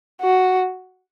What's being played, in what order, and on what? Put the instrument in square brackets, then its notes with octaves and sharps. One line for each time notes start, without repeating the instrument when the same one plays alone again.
[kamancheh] F#4